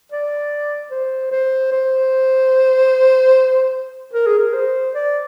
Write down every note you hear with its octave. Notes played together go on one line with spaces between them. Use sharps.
D5
C5
C5
C5
A#4
G#4
A#4
C5
D5